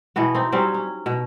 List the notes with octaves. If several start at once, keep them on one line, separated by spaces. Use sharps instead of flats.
B2 E3 B3 F#4
C4 D#4
F#3 G3 C4 C#4
C#4
B2